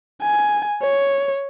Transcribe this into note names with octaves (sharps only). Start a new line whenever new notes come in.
G#5
C#5